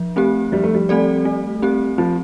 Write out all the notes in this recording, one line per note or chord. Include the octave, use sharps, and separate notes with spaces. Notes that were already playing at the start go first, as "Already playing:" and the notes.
Already playing: F3
A3 C4 G4
F3 G3
A3
G3
A3 C4 A4 D5
A3
C4 G4
F3 C4